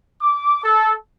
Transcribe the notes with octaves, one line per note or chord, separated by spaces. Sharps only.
D6
A4